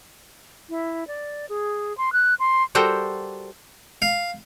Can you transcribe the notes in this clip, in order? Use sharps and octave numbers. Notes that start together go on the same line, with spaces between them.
E4
D5
G#4
C6
F#6
C6
G3 F#4 A4 A#4 C5 G5
F5